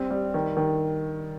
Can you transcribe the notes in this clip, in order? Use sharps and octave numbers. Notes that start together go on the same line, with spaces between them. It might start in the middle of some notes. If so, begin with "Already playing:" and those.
Already playing: G3 C4
G3
D#3
D#3